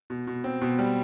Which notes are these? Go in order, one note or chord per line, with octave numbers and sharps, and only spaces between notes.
B2
B2
C4
B2
G3